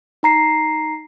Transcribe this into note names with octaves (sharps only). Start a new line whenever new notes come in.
D#4 A#5 C7